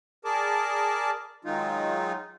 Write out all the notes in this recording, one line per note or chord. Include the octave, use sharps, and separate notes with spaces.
G#4 A#4 D5 A5 D6
D#3 F#3 G#3 D#4 F4